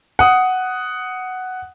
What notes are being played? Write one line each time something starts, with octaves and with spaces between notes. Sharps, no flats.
F#5 D#6